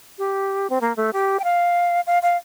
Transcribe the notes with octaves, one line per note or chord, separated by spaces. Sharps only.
G4
C4
A#3
A3
G4
G5
F5
F5
F5